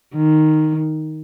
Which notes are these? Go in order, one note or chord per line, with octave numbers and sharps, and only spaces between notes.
D#3